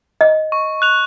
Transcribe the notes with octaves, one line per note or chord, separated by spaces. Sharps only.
D#5
C#6
F#6 F7